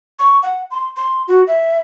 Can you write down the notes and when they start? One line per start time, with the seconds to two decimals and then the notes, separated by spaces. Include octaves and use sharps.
0.19 C#6
0.43 F#5
0.71 C6
0.96 C6
1.28 F#4
1.47 E5